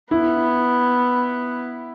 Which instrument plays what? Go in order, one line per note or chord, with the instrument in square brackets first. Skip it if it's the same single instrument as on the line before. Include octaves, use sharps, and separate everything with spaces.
[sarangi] B3 [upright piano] E4